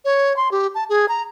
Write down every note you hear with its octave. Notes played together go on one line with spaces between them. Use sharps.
C#5
C6
G4
A5
G#4
A#5